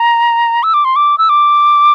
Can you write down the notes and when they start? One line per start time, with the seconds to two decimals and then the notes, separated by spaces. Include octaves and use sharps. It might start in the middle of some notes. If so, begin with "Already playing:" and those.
Already playing: A#5
0.63 E6
0.74 D6
0.85 C6
0.96 D6
1.18 E6
1.29 D6